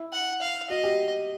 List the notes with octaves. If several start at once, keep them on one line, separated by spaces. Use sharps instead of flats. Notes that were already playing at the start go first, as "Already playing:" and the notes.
Already playing: E4
F#5
F5
F#4 D#5
G4